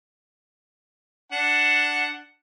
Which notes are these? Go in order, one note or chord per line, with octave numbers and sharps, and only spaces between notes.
D4 F#5